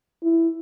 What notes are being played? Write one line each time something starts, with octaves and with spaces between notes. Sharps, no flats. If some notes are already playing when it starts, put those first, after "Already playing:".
E4